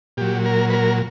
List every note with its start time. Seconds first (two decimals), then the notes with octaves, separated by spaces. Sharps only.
0.17 A#2 F#3 G4
0.46 A#4
0.70 B4
0.73 A#4